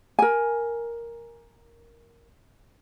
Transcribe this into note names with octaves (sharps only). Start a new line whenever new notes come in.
A#4 G#5